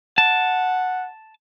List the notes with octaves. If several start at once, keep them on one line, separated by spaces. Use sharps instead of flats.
F#5 A5